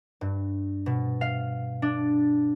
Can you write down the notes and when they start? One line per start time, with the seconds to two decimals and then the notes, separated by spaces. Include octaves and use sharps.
0.21 G2
0.86 B2
1.21 F5
1.82 D4